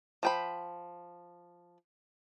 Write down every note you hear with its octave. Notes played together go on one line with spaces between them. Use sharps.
F3 G5 B5